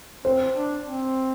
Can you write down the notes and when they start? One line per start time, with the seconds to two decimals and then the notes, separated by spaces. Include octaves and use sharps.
0.24 C4 C5
0.55 D4
0.86 C4